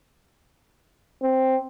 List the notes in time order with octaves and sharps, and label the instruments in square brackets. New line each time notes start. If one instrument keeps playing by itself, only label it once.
[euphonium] C4